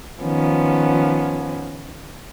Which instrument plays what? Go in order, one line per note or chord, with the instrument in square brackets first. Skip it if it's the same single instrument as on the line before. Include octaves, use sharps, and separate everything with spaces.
[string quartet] D#3 F3 B3 C#4